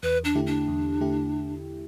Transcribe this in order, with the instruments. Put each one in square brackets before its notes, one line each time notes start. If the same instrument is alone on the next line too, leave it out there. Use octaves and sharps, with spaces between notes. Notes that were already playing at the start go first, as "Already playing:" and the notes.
[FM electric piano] E2 [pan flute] B4
[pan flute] D4
[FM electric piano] D3 A3 E4 G4
[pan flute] D4
[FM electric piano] E2
D3 A3 E4 G4